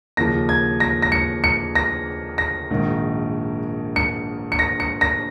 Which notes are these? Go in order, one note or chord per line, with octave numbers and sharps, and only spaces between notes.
D#2 C#3 F3 A#6
G#6
A#6
A#6
C#7
C#7
A#6
A#6
A#1 G#2 D#3
C#7
C#7
A#6
C#7
A#6